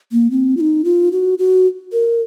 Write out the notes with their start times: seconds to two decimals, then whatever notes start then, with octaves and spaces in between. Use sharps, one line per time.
0.12 A#3
0.31 C4
0.57 F4
0.61 D#4
0.85 F4
1.12 F#4
1.38 F#4
1.93 A#4